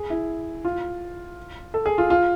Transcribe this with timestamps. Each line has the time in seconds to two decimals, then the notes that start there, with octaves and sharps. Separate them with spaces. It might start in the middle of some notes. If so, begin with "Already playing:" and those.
Already playing: G#4
0.10 E4
0.65 F4
1.74 A4
1.86 G#4
1.98 F4
2.10 F4